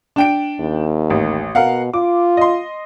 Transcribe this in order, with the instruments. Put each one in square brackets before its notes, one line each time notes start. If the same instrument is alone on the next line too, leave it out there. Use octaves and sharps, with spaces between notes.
[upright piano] D4 G5 D7
[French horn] D#2
[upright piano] A1
[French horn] B2 [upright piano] A#4 F5 F#5
[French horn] F4 [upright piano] D6
[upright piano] D#5 C6